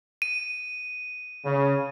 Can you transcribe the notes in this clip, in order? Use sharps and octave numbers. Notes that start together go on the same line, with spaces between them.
D#7
C#3